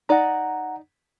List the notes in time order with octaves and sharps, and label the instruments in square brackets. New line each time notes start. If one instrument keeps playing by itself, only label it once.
[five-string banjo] D#4 D5 [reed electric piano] F#5 A#5